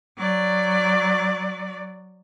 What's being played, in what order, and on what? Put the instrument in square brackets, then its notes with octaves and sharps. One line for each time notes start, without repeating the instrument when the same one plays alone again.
[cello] F#3 D5